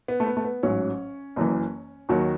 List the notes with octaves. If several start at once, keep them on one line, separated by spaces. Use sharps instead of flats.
B3
A3
B3
A3
B3
A1 G#2 F#3 C#4
F#1 F#2 E3
D#2 D#3 F#3 F#4